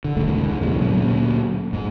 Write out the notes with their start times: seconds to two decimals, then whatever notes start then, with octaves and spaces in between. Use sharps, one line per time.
0.04 D3
0.17 E1 C#2 G#2 A3
0.44 G#2
0.61 B1 E2 C#3 E3
0.81 D2 A#2 F#3 C#4
1.73 G#2